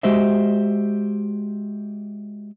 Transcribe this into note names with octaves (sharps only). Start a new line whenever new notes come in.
G#3 F#4 G4 C5 D#5 E5